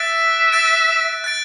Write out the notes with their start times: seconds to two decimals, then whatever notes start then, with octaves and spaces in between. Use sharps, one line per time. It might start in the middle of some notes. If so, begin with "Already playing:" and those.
Already playing: E5 F#6 A6 D7
0.52 F#6 A6 D7
1.24 F#6 A6 D7